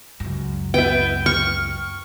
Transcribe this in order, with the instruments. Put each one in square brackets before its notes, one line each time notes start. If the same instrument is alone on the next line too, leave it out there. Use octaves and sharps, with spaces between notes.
[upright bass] C#2 F#2
[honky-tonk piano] B3 E4 [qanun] G5
[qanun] C#6 [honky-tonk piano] F6